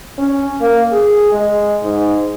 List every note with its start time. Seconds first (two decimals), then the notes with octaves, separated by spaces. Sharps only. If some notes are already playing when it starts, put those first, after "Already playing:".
0.19 C#4
0.61 A#3
0.92 G#4
1.32 G#3
1.83 G#2